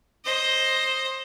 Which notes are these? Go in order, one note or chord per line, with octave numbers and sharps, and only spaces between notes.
C5 D#5